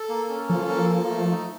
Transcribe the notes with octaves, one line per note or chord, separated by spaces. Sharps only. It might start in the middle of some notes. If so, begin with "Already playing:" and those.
Already playing: A4
A#3
C#4
F3 A4
A#3
A4
A3
D#4